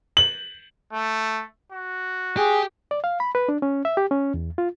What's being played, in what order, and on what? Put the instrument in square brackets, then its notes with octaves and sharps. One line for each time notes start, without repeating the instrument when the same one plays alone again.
[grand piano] F#7
[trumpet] A3
F#4
[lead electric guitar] G4 [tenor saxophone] G#4
[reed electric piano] D5
F5
B5
B4
D4
C#4
E5
G4
C#4
E2
F4